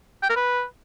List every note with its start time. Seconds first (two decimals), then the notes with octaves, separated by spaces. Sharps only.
0.23 G5
0.30 A#4
0.36 B4